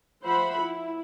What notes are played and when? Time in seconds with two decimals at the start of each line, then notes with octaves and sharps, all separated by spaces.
0.21 F3 C5 E5 F#5 B5
0.61 E4